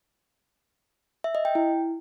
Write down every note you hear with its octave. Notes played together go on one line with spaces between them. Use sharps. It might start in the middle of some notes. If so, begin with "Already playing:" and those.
E5
D#5
G5
E4